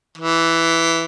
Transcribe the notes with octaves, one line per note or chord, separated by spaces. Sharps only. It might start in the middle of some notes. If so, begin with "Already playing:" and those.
E3